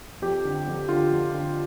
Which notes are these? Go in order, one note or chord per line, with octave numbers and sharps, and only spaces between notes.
F2 G4
D3
F2
D3 F4
F2
D3